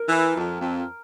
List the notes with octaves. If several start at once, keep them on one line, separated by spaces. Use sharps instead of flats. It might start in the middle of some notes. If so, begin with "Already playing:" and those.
Already playing: A#4
E3
F2
F2